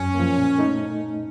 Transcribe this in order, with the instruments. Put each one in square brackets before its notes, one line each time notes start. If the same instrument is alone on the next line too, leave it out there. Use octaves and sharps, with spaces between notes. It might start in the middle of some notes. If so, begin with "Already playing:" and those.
Already playing: [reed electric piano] F#2 [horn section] C#4
[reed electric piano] F3 A#3
A#2
A3 D#4